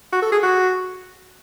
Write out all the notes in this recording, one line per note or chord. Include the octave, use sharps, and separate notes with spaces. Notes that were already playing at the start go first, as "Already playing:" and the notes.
F#4
A4
G#4
F#4